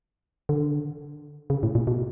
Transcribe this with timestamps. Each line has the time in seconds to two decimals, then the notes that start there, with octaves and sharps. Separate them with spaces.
0.49 D3
1.50 C#3
1.63 A2
1.75 A#2
1.87 B2